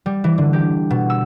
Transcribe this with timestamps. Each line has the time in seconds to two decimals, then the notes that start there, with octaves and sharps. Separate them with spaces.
0.06 G3
0.24 E3
0.38 D3
0.53 G4
0.90 B2
1.10 E6